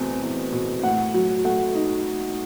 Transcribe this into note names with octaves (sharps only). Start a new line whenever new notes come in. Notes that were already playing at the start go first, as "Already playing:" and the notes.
Already playing: E2 B2 A3 C4
E2
B2
A2 F#5
F#3
A3 F#5
D#4